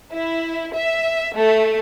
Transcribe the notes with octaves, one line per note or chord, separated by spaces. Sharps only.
E4
E5
A3